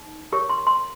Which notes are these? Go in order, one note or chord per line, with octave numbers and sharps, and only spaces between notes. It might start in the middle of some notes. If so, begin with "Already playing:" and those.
Already playing: D#4
G4 A#4 C#5 C#6
C6
C6